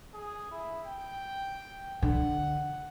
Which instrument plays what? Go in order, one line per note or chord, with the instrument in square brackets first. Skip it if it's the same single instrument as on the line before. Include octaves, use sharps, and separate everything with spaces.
[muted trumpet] G#4
E4
G5
[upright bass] D3 [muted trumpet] F#5